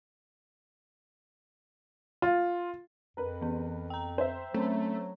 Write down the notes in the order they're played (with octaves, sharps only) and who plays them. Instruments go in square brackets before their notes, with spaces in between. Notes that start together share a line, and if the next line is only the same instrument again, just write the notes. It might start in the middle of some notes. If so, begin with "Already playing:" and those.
[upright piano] F4
[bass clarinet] F2 [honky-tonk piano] A#4 B4
[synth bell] E3 B3
G5 A#5
[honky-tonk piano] C5 E5
[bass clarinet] F#3 [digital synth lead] A3 [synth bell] C4 C#4